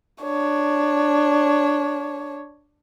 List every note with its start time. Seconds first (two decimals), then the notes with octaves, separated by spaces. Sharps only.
0.23 D4 C#5